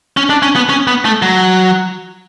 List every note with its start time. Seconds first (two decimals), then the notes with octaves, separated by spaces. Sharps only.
0.17 C#4
0.30 D4
0.42 C#4
0.56 B3
0.69 C#4
0.87 B3
1.05 A3
1.22 F#3